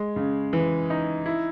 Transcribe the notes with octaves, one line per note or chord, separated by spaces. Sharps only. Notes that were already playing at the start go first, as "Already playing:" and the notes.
Already playing: G#3
C#3
E3
D#4
E4